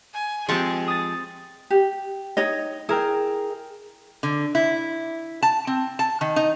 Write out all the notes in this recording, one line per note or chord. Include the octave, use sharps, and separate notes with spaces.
G#5
F3 G#3 C4 G4 G#4 A5 C#6
D#6 A6
G4
D#4 C#5 D#5
E4 G#4 A#4 G5
D3
E4
A5
C4
A5
D#3
D#4